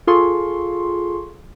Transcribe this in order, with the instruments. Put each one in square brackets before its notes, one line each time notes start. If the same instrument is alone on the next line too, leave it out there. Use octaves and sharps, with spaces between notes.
[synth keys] F4 G#4 A4 C6 C#6